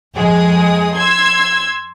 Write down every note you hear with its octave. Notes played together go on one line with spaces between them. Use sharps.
F2 G#3 G#4 D#6
C6 E6 G#6